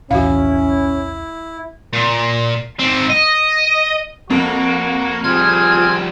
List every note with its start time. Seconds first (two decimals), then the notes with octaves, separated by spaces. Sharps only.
0.11 D1 B1 E2 C#4 E4 F#4 F5
1.93 A#2
2.80 G#2 C4
3.10 D#5
4.30 F2 A#3 F#4 C#6
5.24 F3 G3 C4 F4 G#4 F6 G#6